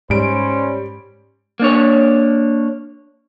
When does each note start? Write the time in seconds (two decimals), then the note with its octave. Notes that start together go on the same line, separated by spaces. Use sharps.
0.10 G#2 G3 C#4 C5 D7
1.60 A#3 D4 C#5